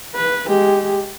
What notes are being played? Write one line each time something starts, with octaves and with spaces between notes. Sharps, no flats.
B4
G#3 G4